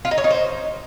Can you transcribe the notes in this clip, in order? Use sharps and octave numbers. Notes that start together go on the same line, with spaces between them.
F4
D#4
C#5
D#4
C5